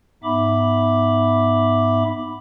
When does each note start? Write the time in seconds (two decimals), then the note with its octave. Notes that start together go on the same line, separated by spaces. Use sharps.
0.24 G#2 B3 D#4 E5 B5 D6